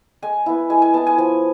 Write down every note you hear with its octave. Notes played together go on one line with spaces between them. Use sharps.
G#3 G#5
B3 E4
G#3 G#5
G#5
B3 E4 A5
G#5
F3 G#5